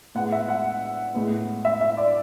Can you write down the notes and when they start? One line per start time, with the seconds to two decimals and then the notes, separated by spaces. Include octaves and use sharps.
0.15 A2 G#3 B3 F#5
0.32 E5
0.48 F#5
1.14 A2 G#3 B3
1.65 E5
1.81 E5
1.97 D5